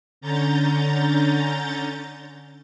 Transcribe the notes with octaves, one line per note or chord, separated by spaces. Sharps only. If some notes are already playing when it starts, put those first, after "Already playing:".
D3 C#4 A#5 G6 A6